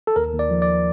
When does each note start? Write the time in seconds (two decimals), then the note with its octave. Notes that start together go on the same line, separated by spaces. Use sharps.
0.07 A4
0.16 D#2 A#4
0.33 D#2
0.39 D5
0.50 F3
0.62 D5